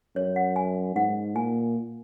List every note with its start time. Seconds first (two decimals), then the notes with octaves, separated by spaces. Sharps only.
0.16 F#2 C#5
0.36 F#5
0.56 G#5
0.96 G#2 F#5
1.35 A#2 G#5